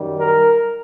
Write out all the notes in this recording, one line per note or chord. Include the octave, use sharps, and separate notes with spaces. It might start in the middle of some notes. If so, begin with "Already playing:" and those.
Already playing: F#2 D#3 G3
A#4